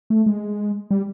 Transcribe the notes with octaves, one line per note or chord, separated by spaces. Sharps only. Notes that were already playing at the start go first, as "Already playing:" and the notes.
A3
G#3
G3